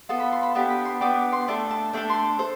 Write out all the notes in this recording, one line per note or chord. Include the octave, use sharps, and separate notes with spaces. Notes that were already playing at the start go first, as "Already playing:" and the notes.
B3 F4 A4 A5
B5
C6
B5
B3 D4 G4 A5
B5
C6
B3 D4 G4 D6
C6
A3 D4 A4 A5
A5
A3 D4 A4 G5
C6
A4 C5